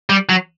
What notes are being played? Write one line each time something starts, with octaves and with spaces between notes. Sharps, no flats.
G3
F#3